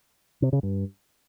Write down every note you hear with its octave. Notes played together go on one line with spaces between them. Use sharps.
C3
C#3
G2